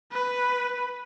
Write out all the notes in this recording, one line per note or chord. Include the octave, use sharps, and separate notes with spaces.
B4